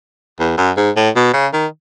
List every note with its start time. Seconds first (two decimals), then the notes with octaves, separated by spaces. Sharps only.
0.40 E2
0.58 F#2
0.77 G#2
0.96 A2
1.16 B2
1.33 C#3
1.53 D#3